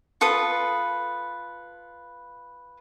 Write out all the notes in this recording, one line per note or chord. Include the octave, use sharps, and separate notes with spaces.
F4 A4 B4 D#6